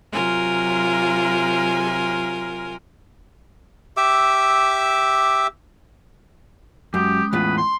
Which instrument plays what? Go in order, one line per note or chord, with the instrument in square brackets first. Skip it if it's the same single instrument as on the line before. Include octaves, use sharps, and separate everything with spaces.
[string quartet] C3 F#3 F4 A#4 G#5 C6
[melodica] G4 E5 D6 E6
[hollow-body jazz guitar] F#2 [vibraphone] G#3 C#4 D#6 [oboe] G4
[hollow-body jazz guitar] E2 A2 F4 [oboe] B4
[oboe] C6